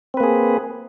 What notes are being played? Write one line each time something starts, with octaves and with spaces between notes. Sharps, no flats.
A#3 C4 G#4 B4